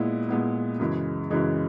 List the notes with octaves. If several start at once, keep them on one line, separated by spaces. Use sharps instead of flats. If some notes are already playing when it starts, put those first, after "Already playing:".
Already playing: A#2 G#3 B3 E4
A#2 G#3 B3 E4
F#2 C#3 E3 G#3
F#2 C#3 E3 G#3